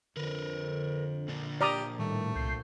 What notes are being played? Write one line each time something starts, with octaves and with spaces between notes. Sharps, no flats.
F2 D3 A#4 B4
A#2 D4
G4 D5 A#5 D#6
A2 D#3 G3 A3
C2 G6 C7